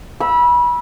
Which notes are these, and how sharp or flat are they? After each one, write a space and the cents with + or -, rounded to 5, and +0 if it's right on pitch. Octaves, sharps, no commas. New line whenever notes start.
B5 -30 E6 +0